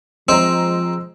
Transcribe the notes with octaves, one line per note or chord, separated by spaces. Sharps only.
F3 G#3 C4 C5 A#5 E6